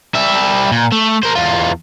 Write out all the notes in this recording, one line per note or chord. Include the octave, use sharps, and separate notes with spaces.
G3 E5
A#2
A3
A#4 C5
E2 F4